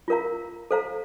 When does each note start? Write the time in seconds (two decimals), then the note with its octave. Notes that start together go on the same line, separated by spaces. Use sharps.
0.08 F4 A#4 F5 A#5
0.71 A4 C5 F5 A#5